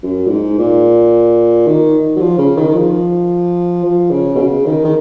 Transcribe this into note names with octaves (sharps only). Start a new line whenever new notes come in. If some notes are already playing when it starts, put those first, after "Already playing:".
F#2
A#2
G#2
A#2
D#3
F#3
F3
C#3
D#3
D#3
F3
F3
C#3
B2
C#3
D#3
D#3